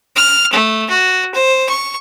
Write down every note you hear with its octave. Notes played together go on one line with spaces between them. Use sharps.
F6
A3
F#4
C5
C#6